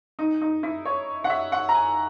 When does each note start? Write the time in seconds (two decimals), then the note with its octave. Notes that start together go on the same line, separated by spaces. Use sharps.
0.19 D#4
0.41 D#4
0.63 E4
0.85 C#5
1.24 F#5
1.30 E5
1.52 F#5
1.69 A#5
1.74 G#5